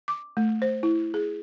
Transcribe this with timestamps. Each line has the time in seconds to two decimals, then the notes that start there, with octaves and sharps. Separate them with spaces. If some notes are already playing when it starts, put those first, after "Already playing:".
0.08 D6
0.37 A3
0.62 C5
0.83 E4
1.14 G#4